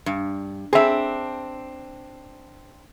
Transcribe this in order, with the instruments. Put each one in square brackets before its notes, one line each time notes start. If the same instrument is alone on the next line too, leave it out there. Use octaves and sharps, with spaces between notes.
[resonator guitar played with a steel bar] G2
[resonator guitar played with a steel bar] C4 D4 [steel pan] G#4 E5